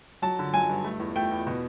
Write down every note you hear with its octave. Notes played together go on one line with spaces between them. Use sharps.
F#3 A5
D3
F#3 G#5
G2
A3
E2
A3 G5
E2
B2